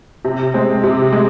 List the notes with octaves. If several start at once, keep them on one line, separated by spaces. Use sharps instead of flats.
C3
G#3 C4
C3
G#3